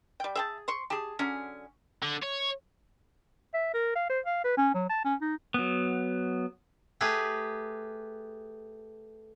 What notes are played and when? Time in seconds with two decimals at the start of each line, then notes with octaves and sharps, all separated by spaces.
0.20 G3 G5
0.35 G#4 E5 G5 A5
0.68 C5 C6 C#6
0.90 G4 G#4 A5
1.19 D3 F#3 C#4 G#4
2.02 D3
2.22 C#5
3.54 E5
3.74 A#4
3.96 F5
4.10 C5
4.26 F5
4.44 B4
4.57 C#4
4.75 F#3
4.89 A5
5.05 C#4
5.22 D#4
5.54 F#3 B3
7.01 A3 G4 G#4 B4